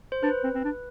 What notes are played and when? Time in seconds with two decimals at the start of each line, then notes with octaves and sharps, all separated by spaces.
0.12 C5
0.23 D4 B4
0.43 C4
0.54 C4
0.64 D4